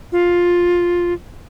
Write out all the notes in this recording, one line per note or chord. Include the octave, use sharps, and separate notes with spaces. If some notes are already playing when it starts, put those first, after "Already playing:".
F4